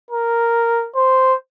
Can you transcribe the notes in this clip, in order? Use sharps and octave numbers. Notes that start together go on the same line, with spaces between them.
A#4
C5